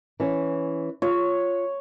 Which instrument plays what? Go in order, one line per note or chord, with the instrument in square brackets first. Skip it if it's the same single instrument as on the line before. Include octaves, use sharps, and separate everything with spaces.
[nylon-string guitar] E3 C#4
[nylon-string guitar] F4 [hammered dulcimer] C#5